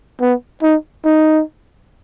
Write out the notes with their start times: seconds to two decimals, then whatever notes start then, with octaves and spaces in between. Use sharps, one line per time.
0.21 B3
0.63 D#4
1.05 D#4